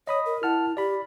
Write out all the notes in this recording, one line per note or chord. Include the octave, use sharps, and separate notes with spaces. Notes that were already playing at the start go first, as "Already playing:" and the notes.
C#5 D#5 B5 D#6
A#4
E4 F#5 A5 F6
G4 D5 B5